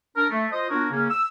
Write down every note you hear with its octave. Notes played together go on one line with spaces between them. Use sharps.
D4 A#4
A3
F4 C5 D#5
B3 D4 F4 F#4 A#4 C#5
C#3 A#3 C#4
E6